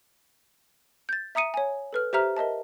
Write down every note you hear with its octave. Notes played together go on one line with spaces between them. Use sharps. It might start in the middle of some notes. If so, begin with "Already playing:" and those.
G6 A6
E5 A#5 D#6 C#7 D#7
C#5 G#5
A4 B4 F6
G4 C5 E5 A#5 F6
A#4 D#5 E5 A5